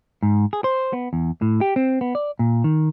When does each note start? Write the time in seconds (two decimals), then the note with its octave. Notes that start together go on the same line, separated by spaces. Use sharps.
0.23 G#2
0.53 G#4
0.64 C5
0.93 B3
1.13 E2
1.42 A2
1.61 G4
1.76 C4
2.01 B3
2.15 D5
2.39 A#2
2.64 D#3